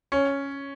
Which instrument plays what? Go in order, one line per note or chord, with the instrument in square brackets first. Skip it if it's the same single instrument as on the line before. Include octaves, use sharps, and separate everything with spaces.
[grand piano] C#4